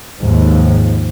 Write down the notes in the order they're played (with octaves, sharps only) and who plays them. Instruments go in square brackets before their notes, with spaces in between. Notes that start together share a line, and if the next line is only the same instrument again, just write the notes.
[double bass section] D#2 G#2 F3